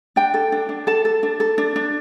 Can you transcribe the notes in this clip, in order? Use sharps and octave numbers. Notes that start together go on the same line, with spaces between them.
D4 G5
A4
D4
D4
A4 A5
A4
D4
A4
D4
D4